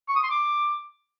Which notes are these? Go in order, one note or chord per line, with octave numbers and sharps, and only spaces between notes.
C#6
D#6
C6
D6